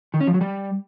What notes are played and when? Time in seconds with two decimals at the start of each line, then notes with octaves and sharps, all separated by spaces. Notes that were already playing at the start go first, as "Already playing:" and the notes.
0.14 D#3
0.21 C#4
0.27 F3
0.34 F#3
0.41 G3